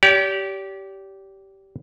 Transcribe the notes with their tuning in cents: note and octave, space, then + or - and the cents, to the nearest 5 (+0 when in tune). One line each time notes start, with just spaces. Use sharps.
G4 -15 D5 -45